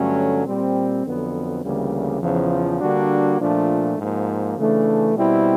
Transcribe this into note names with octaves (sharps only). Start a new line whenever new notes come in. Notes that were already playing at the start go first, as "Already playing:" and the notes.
Already playing: G2 D3 F#3 A3 C#4
A#2 G3 C4
F2 D3 F#3 B3
D2 C#3 E3 G3 A#3
E2 C#3 F3
D3 G3 A#3 D4 F#4
A#2 F3 A3 D4
G#2 F3 A#3
C#3 E3 A3 D4
B2 G3 C4 E4